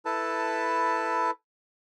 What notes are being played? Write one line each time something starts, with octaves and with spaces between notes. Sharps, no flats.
E4 A4 B4 A5